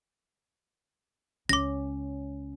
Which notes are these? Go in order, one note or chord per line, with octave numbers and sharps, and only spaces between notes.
C#2 C#4 D6 A#6